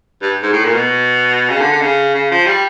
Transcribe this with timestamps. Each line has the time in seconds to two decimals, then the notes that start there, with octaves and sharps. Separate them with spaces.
0.22 G2
0.43 G#2
0.53 A2
0.65 A#2
0.75 B2
1.50 C#3
1.61 D3
1.72 D3
1.82 C#3
2.15 C#3
2.31 F3
2.47 G3